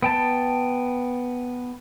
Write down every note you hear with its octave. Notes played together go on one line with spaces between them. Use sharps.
B3 G5 A5